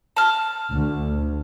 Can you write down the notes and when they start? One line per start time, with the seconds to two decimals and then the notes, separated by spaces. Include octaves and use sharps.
0.16 A5 F6
0.72 D2